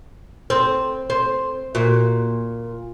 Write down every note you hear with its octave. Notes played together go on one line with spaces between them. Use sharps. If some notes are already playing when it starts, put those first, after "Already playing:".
C4
C4
A#2 F#4